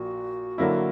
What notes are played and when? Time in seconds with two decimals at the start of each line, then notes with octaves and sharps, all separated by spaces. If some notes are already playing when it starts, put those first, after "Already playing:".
Already playing: A#1 A#2 F#4
0.58 D3 F#3 A#3 E4